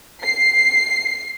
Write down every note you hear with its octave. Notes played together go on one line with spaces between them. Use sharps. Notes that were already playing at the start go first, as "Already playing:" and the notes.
C7